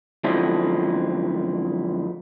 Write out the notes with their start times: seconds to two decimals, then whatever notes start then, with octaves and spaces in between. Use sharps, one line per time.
0.24 F#2 D3 F3 G#3 C4 E4